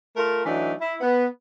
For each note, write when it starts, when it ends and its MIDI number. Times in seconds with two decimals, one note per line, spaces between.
0.17 0.44 57
0.17 0.44 65
0.17 0.44 70
0.46 0.73 52
0.46 0.73 54
0.46 0.73 57
0.46 0.73 62
0.46 0.73 63
0.81 0.95 64
1.01 1.25 59